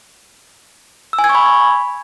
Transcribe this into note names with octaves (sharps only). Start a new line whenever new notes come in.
E6
G#5
G#6
C#6
B5